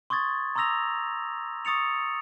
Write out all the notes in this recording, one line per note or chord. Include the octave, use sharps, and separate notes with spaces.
C6 C#6 D#6 G#6 A6
A#5 C6 D#6 E6 A#6 F7
C#6 D#6 A6 C#7 F7